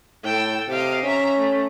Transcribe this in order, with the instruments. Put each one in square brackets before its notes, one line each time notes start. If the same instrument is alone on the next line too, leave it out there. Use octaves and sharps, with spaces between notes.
[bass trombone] A2 [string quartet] A4 G5 E6
[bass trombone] C3 [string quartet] D#5 F5 D6
[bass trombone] C#4 [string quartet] E5 A#5
[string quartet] A3